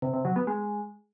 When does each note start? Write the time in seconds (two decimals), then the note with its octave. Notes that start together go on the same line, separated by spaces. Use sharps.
0.02 C3
0.14 C3
0.25 F#3
0.36 B3
0.47 G#3